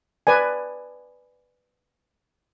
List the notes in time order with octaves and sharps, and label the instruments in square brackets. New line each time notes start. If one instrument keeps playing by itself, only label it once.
[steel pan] B4 D5 G#5